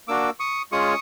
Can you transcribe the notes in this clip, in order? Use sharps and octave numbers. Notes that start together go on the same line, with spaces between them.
A#3 D4 F#4 D6 E6
C#6 D#6
G#3 C#4 F4 G#4 C#6 D#6